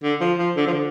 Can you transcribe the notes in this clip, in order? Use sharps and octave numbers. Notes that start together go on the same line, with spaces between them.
D3
F3
F3
D3
F3
D3